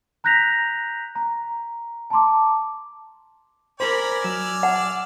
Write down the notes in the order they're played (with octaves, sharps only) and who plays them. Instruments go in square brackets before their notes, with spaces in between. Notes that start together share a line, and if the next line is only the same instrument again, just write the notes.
[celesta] A#5 F#6 G6 A#6 B6 F7
A#5
A5 A#5 C6 D6
[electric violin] A#4 B5 [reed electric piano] C5 [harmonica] D5 G#5
[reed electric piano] F#3 [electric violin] E6 F6
[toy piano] F#5